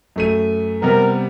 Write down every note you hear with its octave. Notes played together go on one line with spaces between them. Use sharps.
F#2 A3 D#7
C3 G3 B3 A#4